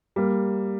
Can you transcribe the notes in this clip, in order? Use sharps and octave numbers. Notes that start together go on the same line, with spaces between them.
G3 A#3